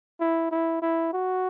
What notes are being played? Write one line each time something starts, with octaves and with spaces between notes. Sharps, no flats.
E4
E4
E4
F#4